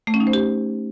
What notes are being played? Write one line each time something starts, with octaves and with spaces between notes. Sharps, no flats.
A3
C#4
D#4
C5
G4